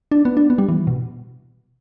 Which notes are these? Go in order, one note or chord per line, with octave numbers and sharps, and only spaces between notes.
D4
B3
D4
B3
G3
E3
B2